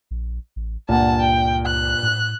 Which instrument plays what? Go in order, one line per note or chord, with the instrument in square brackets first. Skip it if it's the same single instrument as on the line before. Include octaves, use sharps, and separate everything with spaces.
[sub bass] A#1
A1
[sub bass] C#2 [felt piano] G2 A#2 [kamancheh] F#5 A5
[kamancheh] G5
F#6
[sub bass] A2